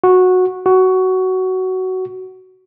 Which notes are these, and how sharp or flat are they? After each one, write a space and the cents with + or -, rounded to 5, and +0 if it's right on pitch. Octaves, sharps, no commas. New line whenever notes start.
F#4 -10
F#4 +15